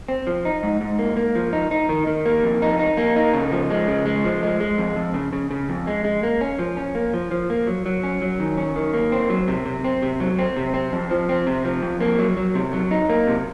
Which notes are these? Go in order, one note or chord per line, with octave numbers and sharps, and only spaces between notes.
C4
F3
D#4
G#2
G#2
A#3
A#3
F3
D#4
D#4
D#3
D#3
A#3
F2
D#4
D#4
A#3
D#4
C#3
F3
G#3
C#3
G#3
F3
G#3
G#3
F2
F2
C#3
C#3
C#3
F2
G#3
G#3
A#3
C#4
F3
C#4
A#3
F3
F3
A#3
F#3
F#3
C#4
F#3
D#3
C#4
D#3
A#3
C4
F#3
C3
C3
C4
C3
F#3
C4
C3
C4
F2
F3
C4
C3
F3
F2
A#3
F#3
F#3
C3
F#3
D#4
A#3
C3